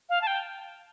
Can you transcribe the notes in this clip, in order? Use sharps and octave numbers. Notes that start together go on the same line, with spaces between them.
F5
A5
G5